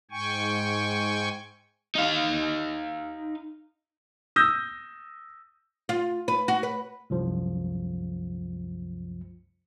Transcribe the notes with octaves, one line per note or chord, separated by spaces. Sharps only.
G#2 G5 G#5 C#6
D#4 F5
D#6 E6 G6 A#6
F4
B4
F#4
B4
C2 F#2 F3